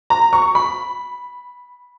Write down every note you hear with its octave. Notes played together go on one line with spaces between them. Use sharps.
A#5
C#6
B5